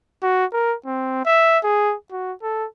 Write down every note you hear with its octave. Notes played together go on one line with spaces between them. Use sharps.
F#4
A#4
C4
E5
G#4
F#4
A4